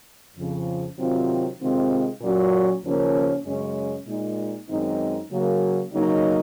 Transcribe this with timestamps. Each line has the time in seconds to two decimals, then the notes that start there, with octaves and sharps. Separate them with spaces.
0.36 F2 C#3 F3
0.97 C3 D#3 F#3 C4 F4
1.59 C3 D#3 G#3 C4 F4
2.21 A#2 F#3 C#4
2.84 D#2 C#3 F3 A#3 C#4
3.45 F#2 C#3 G#3 C#4
4.07 A#2 G#3 D#4
4.68 F#2 D#3 G#3 C4 D#4
5.30 C#3 F#3 A#3
5.93 C#3 F#3 A#3 D#4